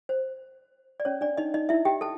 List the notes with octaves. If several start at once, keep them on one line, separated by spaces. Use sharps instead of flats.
C5
D5
C#4 C#5
D4 D5
D#4 D#5
D#4 D#5
E4 E5
G4 G5
A4 A5